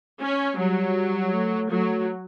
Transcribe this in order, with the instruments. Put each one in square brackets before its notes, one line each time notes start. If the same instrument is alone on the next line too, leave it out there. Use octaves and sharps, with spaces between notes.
[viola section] C#4
[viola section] F#3 [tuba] G3
[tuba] A3
[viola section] F#3 [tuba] A3